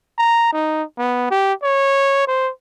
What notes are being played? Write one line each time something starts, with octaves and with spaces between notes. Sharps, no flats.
A#5
D#4
B3
G4
C#5
C5